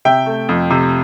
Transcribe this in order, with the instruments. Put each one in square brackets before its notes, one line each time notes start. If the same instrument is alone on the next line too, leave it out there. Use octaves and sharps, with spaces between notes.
[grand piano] C3 E5 G5
A3
F2
C3